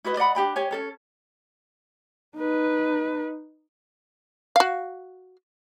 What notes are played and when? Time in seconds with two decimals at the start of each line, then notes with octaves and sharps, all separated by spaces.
0.05 E4 F#4 B4 D#5
0.17 D5 D#5 F#5 B5
0.35 D4 G4 G5 B5
0.56 G4 C#5 G#5
0.71 C#4 A4 C#5
2.37 D#4 B4
4.56 F#4 F5